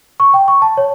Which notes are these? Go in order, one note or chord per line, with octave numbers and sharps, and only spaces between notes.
C#6
G5
C#6
A5
C#5